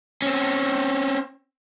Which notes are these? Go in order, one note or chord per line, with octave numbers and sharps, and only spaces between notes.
C4 C#4